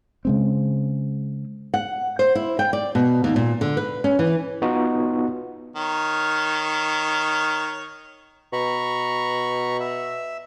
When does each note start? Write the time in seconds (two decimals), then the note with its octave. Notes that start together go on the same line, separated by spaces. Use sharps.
0.25 C#3 G#3 C4
1.74 F#5
2.19 C5
2.35 E4
2.59 G5
2.73 D5
2.95 B2
3.24 D#2
3.36 A#2
3.61 D3
3.77 B4
4.04 C#4
4.19 E3
4.62 B3 D#4 F4 F#4
5.76 D#3 C#5
8.53 B2 A#5 B5 C#6
9.80 E5